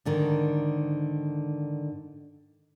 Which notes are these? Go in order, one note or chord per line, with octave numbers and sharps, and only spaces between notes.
G#2 D3 D#3